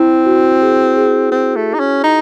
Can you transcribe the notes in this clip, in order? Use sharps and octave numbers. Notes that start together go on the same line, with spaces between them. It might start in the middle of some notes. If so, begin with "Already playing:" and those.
Already playing: C4 E4
F#4
G#4
G#4
C4
A3
D#4
C#4
D#4